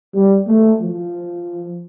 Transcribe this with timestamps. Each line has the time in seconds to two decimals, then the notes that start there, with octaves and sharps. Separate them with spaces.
0.14 G3
0.47 A3
0.81 F3